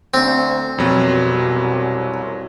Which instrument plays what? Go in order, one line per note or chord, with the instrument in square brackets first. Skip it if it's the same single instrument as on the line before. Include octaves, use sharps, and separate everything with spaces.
[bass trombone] D2 [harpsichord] C4
[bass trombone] C2 [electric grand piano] F2 F#3 [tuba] B2